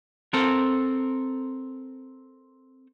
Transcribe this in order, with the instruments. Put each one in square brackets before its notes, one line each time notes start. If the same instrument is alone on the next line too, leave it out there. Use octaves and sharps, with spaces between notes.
[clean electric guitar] C4 A4 A#4